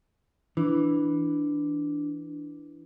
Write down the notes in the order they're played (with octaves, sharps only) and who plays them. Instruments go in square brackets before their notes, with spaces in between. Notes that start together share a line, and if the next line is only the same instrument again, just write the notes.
[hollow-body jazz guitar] E3 [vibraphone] D4